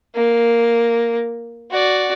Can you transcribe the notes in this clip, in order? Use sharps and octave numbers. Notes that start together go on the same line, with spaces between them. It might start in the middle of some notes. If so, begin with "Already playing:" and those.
A#3
F#4 D5